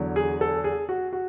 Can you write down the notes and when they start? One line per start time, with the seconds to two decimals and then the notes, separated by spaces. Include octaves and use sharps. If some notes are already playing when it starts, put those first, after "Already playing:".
Already playing: E2 D3 F#3
0.16 G#4
0.41 A4
0.64 G#4
0.89 F#4
1.13 F#4